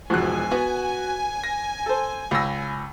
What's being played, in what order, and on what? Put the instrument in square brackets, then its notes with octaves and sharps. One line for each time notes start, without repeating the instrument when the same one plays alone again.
[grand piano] E1 F3 [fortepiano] G#2 F#4 F#6 [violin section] G#5
[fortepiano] B3 [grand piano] F#4
[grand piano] A#6
[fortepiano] A4 C5
[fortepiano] C#2 E6 [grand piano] B5 A#6